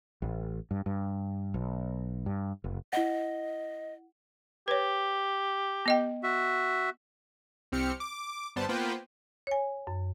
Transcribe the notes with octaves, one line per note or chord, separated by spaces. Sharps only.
A1
G2
G2
B1
G2
F#1
E4 D#5 F#5
G4 B4 C#5
B3 D#5 G5
F#4 E5
C2 C4 G4 F6 C#7
D6
G1 G3 B3 C5 A5
A#3 B3 F4 B4 C5 G5
C#5 G#5
F#2